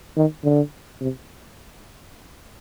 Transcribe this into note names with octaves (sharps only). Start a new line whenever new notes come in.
D#3
D3
C3